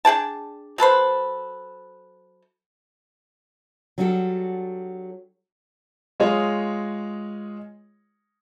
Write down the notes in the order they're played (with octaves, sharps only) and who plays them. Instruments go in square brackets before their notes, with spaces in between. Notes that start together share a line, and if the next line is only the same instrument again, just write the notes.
[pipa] D4 G#4 G5 A5
F#3 A4 B4 C5
[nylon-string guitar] F#3 G3 D4 F#4 G4 A4
[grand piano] G#3 F4 G#4 C#5 D#5